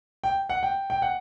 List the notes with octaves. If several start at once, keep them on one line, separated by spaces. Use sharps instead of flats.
G5
F#5
G5
G5
F#5